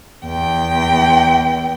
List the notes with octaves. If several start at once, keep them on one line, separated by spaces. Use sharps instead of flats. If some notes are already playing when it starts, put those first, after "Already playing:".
E2 G5